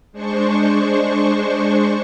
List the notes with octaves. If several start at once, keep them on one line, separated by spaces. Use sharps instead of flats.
G#3 D4 C5 C#6